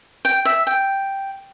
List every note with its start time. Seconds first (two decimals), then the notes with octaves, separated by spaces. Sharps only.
0.25 G5
0.45 E5
0.67 G5